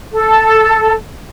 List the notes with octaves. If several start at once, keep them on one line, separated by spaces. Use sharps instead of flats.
A4